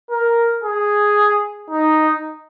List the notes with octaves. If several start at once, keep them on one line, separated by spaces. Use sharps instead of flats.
A#4
G#4
D#4